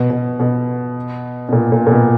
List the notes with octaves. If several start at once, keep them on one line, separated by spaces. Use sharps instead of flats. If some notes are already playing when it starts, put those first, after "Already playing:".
Already playing: B2
B2
B2
B2
A#2
A#2
A#2
B2